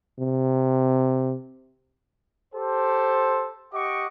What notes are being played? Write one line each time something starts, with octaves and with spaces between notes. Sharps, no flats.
C3
G4 A4 C5
G4 D#5 F#5 C#6 D6